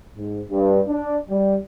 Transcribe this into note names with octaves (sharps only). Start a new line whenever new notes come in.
G#2
G2
D4
G3